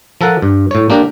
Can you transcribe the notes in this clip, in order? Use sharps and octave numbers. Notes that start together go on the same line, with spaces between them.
F3 A4 A#4 F#5
G2
A2 C#5
A#3 D4 G4 A#4